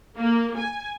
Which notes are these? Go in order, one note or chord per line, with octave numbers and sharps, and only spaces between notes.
A#3
G#5